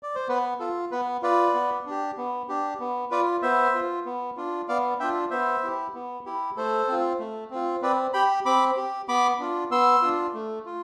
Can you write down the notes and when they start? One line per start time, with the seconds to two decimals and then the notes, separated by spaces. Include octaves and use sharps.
0.03 D5
0.15 C5
0.29 B3 B4
0.60 F4 A4
0.91 B3 B4
1.22 F4 B4 D5
1.54 B3
1.86 D4 G4
2.17 B3
2.49 D4 G4
2.80 B3
3.11 F4 B4 D5
3.42 B3 C5 E5
3.74 F4
4.05 B3
4.37 D4 F4
4.68 B3 D5 F5
5.00 D4 F4 E5 G5
5.31 B3 C5 E5
5.63 E4 G4
5.94 B3
6.26 E4 G4
6.57 A3 A4 C5
6.88 C4 F4
7.19 A3
7.50 C4 F4
7.82 C4 B4 D5
8.13 G4 G5 B5
8.45 C4 B5 D6
8.77 G4
9.08 B3 B5 D6
9.40 D4 F4
9.71 B3 C6 E6
10.02 D4 F4
10.34 A3
10.66 F4